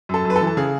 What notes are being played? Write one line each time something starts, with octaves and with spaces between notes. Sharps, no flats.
F#2 A4
F#2
B4
A4
E3
A4
C#3 G#4